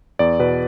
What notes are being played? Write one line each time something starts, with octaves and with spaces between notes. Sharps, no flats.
E2 D5
B2 B4